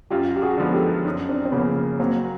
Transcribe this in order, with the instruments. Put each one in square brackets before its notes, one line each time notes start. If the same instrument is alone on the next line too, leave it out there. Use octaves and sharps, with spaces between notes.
[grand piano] F#2 [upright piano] F4 G4
[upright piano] G4
F#4 G#4
[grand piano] D3 F3 G#3 B3
[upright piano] G4 A4
[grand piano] F#2 [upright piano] C#4 D#4
[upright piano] C4 D4
C4
[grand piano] C#3 F3 A#3 [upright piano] B3 C#4
[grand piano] F#3 [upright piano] A#3 C4